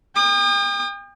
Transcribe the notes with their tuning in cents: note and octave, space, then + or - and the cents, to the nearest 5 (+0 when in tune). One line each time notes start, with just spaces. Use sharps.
G5 +40 D#6 -35